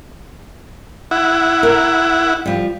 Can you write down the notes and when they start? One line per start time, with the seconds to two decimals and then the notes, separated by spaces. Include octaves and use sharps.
1.11 E4 F#5
1.63 A#4
2.46 F3 G3